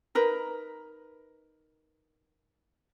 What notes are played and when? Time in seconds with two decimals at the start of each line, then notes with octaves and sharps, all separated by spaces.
0.15 D#4 A#4 B4